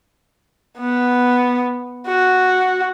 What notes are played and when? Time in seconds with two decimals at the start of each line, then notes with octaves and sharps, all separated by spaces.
0.79 B3
2.07 F#4